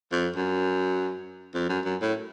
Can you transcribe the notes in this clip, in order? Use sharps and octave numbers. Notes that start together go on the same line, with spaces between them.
F2
F#2
F2
F#2
F#2
A2